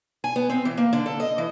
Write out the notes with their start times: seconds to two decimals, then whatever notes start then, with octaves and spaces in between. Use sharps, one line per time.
0.24 G#5
0.36 B3
0.49 C4
0.65 E3
0.78 A#3
0.93 D3
1.06 A4
1.20 D#5
1.38 E3